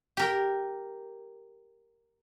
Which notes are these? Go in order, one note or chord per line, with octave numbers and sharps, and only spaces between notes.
G4 A#4 G5